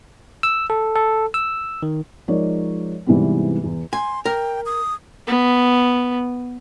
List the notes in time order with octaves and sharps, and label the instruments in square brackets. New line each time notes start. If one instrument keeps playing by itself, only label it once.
[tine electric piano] E6
A4
A4
E6
D#3
[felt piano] F3 G#3 D#4 A#4 C#5 D5
G#2 C3 E3 G3 G#3 B3
E2
[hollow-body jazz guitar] G#5 [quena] C6
[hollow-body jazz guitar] A#4 [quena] G5
[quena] D#6
[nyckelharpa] B3